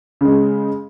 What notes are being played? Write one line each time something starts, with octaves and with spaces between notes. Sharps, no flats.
C#3 G#3